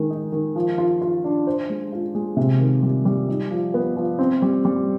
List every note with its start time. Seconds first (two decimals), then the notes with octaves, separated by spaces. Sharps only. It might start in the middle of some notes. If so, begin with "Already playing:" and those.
Already playing: D#3 G#3
0.10 D#4
0.32 D#3
0.56 F3
0.78 F4
1.02 F4
1.24 D4
1.47 C5
1.70 G#3
1.92 F4
2.15 G#3
2.37 C3
2.59 D#3
2.82 G3
3.05 G3
3.29 D#4
3.51 F3
3.74 B3
3.96 F3
4.19 C4
4.42 G3
4.65 G3